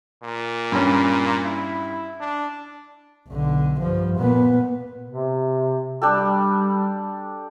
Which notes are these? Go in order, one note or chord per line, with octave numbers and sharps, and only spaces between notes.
A#2
G2 C#4
E4
D4
B1 D3
G2 F3
A#2 B3
C3
G3 D4 G4 A4